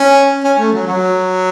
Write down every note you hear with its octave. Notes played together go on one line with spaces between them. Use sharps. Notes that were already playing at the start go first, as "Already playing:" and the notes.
Already playing: C#4
C#4
A3
F#3
F#3